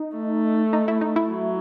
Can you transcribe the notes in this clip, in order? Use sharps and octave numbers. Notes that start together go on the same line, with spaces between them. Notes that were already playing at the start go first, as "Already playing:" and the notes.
Already playing: D#4
A3
D#4
E4
D#4
E4
F#3